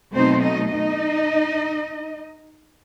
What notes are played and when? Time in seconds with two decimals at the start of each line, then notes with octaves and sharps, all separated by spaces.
0.13 B2 F#3 A3 C4 D#4 C5
0.42 D#4 D#5
0.71 D#4 D#5